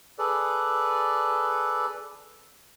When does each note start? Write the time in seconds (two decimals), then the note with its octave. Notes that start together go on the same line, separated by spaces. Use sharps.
0.19 G#4 A4 B4 D5